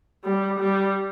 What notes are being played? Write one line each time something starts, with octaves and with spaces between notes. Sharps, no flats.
G3
G3